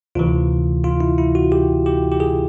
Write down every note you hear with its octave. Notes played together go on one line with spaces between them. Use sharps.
D2 C3 E3 F4
F4
E4
E4
F#4
G4
G4
G4
G#4